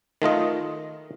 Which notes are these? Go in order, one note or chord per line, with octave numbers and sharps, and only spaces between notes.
D#3 A3 F4 D#5